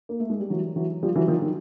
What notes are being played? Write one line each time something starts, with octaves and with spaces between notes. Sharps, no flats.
A#3
A3
G#3
G3
E3 F#3
E3 F#3
F3 G3
E3 F#3
D#3 F3
D#3